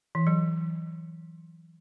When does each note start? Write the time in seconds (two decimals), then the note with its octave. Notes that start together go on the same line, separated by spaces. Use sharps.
0.15 E3
0.27 F#3